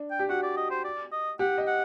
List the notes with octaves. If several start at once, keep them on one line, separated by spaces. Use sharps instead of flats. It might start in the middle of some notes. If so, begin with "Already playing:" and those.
Already playing: D4
G5
G4
F#4 F#5
D5
D#5
C5
D5
D#5
G4 F#5
D#5
F#5